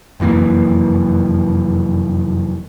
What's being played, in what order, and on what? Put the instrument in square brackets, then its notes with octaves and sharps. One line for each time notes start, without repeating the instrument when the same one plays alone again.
[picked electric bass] F1 F#2 E3 A#3